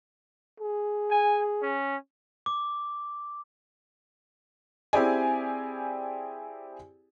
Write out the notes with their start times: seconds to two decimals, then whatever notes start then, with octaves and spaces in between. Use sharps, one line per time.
0.60 G#4
1.11 G#5
1.63 C#4
2.46 D6
4.93 C4 E4 G4 G#4 D5 G#5